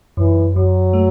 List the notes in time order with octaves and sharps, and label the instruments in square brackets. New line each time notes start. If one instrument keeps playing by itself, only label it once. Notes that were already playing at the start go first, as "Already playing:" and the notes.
[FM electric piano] F#2 [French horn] E3
[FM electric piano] F#2 [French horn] F#3
[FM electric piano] A3